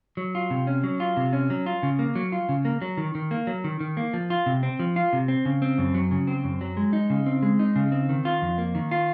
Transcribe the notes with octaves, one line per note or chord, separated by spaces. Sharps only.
F#3
F4
C3
C#4
F#3
F4
C3
C#4
F#3
F4
C#3
A#3
F#3
F4
C#3
A#3
F#3
D#3
D#3
A#3
F#3
D#3
D#3
A#3
F3
F4
C3
C4
F3
F4
C3
C4
C#3
C4
F#2
F#3
C#3
C4
F#2
F#3
G#3
D#4
C#3
C4
G#3
D#4
C#3
C4
D#3
F4
F2
A#3
D#3
F4